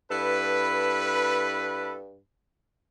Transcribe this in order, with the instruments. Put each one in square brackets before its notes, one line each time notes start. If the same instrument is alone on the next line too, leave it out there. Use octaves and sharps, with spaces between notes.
[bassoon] G2 [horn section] E4 A4 B4